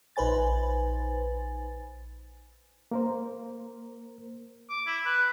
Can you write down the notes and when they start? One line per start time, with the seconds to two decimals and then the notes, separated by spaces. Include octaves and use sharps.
0.16 A#1 D#4 B4 C5 G#5 A6
2.91 A#3 A#4 C5
4.70 D6
4.87 E4
5.05 B4